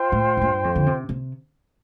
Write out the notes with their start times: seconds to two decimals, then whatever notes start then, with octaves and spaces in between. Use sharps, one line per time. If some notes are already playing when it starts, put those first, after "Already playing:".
Already playing: F4 C5 G5 C6
0.12 A2
0.37 F2
0.42 G2
0.64 F2
0.76 D3
0.86 C3
1.09 C3